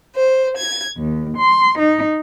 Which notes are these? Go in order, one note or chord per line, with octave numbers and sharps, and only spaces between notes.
C5
G#6
D#2
C6
D#4